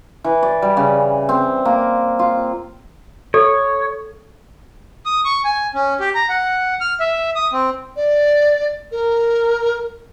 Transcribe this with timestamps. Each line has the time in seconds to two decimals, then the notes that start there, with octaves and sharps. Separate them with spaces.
0.24 E3
0.43 D5
0.62 G3
0.77 C#3
1.29 C4
1.65 A#3
2.19 F4
3.34 A4 C#5
5.06 D#6
5.25 C#6
5.44 G#5
5.74 C#4
6.00 G4
6.15 A#5
6.29 F#5
6.81 F6
7.00 E5
7.35 D#6
7.53 C4
7.96 D5
8.92 A#4